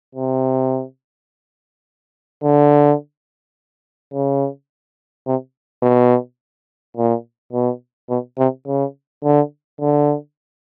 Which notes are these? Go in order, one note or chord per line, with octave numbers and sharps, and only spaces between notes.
C3
D3
C#3
C3
B2
A#2
B2
B2
C3
C#3
D3
D3